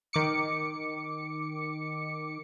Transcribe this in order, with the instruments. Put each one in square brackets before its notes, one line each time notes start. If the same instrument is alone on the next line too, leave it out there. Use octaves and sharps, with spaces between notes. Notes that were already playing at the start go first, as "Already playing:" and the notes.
[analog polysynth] D#3 D6 C#7